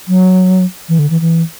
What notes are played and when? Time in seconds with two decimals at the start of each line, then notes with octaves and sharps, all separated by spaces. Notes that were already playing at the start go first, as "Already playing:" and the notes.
0.08 F#3
0.89 E3
0.99 D3
1.10 E3
1.21 E3